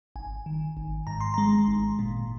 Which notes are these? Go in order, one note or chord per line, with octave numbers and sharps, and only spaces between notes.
G#1 G#5
D#3
G#1
G#2 A#5
C6
G#3 A#5
G#1
A#2